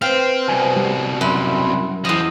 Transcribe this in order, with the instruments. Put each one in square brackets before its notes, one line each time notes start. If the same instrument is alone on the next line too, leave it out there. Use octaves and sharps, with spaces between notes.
[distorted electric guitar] C4 [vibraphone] B4 C5 [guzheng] F5
[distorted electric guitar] C2 B2 [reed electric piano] G#5
[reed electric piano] G3
[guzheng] F#2 [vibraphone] E5 B5 C6
[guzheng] E2 D#5 [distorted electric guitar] F3